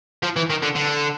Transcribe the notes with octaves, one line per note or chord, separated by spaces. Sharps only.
F3
E3
D#3
D3
D3